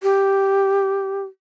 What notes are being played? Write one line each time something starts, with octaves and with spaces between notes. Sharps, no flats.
G4